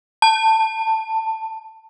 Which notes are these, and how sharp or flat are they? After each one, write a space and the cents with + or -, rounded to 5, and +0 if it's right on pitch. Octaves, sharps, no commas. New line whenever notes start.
A5 +15